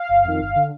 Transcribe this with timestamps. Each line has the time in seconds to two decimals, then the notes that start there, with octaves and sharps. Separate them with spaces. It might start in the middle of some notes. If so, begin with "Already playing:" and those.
Already playing: F5
0.09 G1
0.24 F2 D#3
0.40 G1
0.55 D3